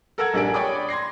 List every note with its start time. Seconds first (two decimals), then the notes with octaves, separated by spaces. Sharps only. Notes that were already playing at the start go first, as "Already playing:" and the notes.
0.18 A4 A#4 F#5 A5 E6 G#6
0.34 A#1 G3 D4 D5 G#5 D7
0.54 C#5 D5 G5 B5 D6 D#6
0.89 C6 G#6 A#6 C7